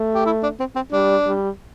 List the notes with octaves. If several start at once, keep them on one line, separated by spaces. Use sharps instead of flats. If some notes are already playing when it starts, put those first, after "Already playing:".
Already playing: A3
G4
E4
D4
C4
C4
G3 D4
G3